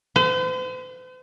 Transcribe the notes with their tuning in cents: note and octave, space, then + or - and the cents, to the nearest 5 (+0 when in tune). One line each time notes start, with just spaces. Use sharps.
C5 -45